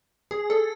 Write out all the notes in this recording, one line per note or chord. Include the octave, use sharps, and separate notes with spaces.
G#4
A4